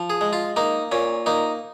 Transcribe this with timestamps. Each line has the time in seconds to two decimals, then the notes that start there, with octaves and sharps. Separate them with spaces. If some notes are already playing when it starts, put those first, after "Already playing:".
Already playing: F3
0.10 G#4
0.21 G#3
0.33 F4
0.56 A#3 D#4
0.92 A#2 C#4
1.26 A#3 D#4